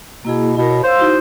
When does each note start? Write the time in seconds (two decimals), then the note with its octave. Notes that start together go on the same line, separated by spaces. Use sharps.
0.25 B2 A#3 E4 G#4
0.57 B2 E4 A#4
0.70 C#5
0.84 C5 F5 C6 E6
0.99 D#4 E4 F#4